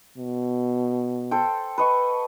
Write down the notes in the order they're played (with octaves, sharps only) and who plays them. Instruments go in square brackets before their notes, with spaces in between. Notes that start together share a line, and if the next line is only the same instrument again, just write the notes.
[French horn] B2
[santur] A4 C5 G5
B4 D#5 C#6